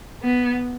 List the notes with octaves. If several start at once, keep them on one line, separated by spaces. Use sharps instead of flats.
B3